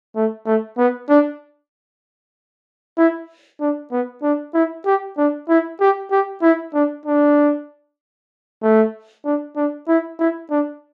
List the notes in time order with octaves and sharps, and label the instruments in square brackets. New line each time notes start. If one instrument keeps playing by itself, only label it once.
[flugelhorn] A3
A3
B3
D4
E4
D4
B3
D4
E4
G4
D4
E4
G4
G4
E4
D4
D4
A3
D4
D4
E4
E4
D4